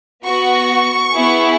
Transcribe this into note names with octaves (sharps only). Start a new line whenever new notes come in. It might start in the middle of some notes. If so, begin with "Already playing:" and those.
B3 F#4 C#6
B3 E4 G#4